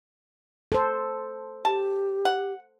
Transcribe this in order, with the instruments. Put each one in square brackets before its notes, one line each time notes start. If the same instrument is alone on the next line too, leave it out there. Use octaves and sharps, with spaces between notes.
[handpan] A4 C5
[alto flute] G4 [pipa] A5
[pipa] F#5